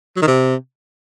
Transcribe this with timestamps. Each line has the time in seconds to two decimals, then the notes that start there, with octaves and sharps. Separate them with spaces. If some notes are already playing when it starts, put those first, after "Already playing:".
0.16 F#3
0.22 D#3
0.27 C3